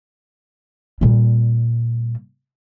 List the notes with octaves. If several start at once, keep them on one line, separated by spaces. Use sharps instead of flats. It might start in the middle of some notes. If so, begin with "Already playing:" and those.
A#2 G3